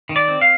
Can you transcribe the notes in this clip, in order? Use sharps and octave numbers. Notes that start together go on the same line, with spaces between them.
D#3
D5
C4
F5